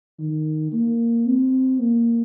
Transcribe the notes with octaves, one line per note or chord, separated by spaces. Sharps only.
D#3
A#3
C4
A#3